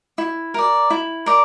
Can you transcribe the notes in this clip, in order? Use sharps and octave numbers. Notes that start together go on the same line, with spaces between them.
E4
A#4 D5
E4
A#4 D5